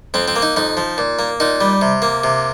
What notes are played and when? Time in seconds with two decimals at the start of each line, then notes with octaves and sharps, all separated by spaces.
0.14 F2 C4
0.28 C4
0.36 A#3
0.42 D#4
0.56 F2 D#4
0.77 F3
0.98 A#2
1.19 A#3
1.40 A#2 D#4
1.61 G3
1.81 C3
2.02 A#3
2.24 C3